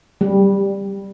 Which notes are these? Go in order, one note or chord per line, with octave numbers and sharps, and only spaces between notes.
G3